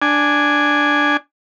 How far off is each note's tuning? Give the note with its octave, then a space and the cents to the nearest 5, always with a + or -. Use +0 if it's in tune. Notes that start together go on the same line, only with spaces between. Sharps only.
D4 +0 G#5 +0